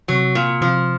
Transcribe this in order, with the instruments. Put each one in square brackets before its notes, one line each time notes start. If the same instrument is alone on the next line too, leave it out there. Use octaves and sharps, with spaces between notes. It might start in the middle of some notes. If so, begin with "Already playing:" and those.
[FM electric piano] C3 [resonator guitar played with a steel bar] F#3
[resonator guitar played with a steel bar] A#2
[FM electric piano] C3 [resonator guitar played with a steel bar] F3